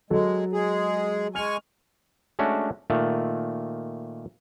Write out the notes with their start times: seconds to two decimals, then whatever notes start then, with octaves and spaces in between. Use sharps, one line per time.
0.10 F#3 G#3 A4
0.53 G#3 G#4
1.35 G#3 G#5 C#6 F6 F7
2.39 G#3 A3 C#4 D4 F#4
2.90 A#2 D#3 A3